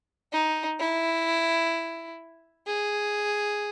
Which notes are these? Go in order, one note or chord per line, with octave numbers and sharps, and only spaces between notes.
D#4
E4
G#4